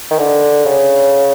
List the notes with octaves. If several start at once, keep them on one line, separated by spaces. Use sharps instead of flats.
D#3
D3
C#3